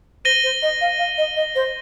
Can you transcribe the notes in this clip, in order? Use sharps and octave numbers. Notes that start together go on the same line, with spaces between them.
C5 A#6 D#7 G7
C5
D#5
F5
F5
D#5
D#5
C5